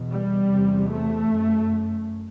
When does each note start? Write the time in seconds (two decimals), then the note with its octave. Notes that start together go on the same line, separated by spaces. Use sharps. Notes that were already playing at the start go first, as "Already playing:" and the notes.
Already playing: E2 B2
0.11 G3
0.50 E2 C3
0.90 A3
1.30 F#2